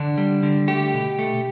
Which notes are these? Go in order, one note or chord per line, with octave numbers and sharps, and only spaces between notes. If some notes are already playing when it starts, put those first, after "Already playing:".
Already playing: D3 D4
G3
D3
A3 G4
B2
A3